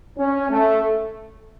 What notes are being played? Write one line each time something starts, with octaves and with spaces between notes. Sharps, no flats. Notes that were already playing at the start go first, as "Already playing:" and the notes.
C#4
A3